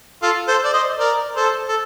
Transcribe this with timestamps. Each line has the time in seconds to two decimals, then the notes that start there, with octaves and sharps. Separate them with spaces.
0.22 F4 A4
0.48 A4 C5
0.65 D5
0.74 C5 D#5
0.99 A#4 D5
1.36 A4 C5
1.68 A4